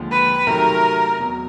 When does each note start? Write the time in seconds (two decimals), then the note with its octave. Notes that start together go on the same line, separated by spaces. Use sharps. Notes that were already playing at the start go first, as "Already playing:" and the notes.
Already playing: D#2 D3 F3 G#3
0.11 B4
0.46 C3 D#3 F#3 A3 A#4
1.19 E2 B2 F#3